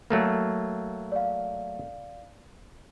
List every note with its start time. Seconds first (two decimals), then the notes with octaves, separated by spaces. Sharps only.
0.10 F#3 A3 A#3
1.12 D5 F5